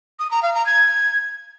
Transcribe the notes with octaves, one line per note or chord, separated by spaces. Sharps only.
D#6
A#5
F5
A#5
G#6